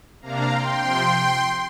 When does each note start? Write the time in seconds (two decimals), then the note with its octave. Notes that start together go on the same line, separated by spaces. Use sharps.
0.22 C3 A#3 D4 F5 A#5
0.52 G5 C6
0.82 C3 F3